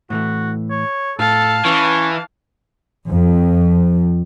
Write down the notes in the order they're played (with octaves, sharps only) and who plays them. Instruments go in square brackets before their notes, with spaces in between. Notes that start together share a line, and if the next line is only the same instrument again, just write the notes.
[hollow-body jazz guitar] A2 E3 A3 [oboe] F#4
[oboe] C#5
[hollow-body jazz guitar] A2 [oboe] A4 [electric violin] F5 A5
[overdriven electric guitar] E3 [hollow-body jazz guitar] C#4 [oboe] C#6
[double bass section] F2